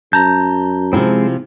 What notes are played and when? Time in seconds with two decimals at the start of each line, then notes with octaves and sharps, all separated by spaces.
0.13 F#2 A5 A#5 G6
0.93 C3 F3 G#3 C4 E4